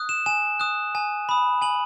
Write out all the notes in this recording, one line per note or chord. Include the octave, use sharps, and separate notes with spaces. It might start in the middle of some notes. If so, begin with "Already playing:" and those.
Already playing: D#6 F#6
E7
G#5 E7
D#6 F#6
G#5
B5 D#6
G#5 F#7